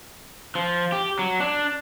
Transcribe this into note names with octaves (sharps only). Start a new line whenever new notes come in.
F3
G4
F#3
D4